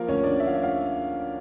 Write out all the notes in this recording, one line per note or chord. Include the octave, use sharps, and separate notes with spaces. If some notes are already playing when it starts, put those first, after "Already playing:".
Already playing: F3 A#3 A#4
D2 C#4 C#5
D2 D4 D5
F3 E5
F5
E5
F5